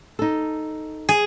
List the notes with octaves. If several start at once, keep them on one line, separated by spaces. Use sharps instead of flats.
D#4 A4
G#4